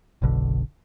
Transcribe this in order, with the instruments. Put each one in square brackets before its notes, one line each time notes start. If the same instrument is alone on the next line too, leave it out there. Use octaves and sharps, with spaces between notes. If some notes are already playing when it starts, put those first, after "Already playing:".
[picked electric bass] F#1 B1 B2 D3